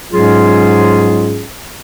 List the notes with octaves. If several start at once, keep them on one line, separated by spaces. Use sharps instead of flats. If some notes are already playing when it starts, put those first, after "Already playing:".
G#2 F#3 G#3 C#4 F4 G#4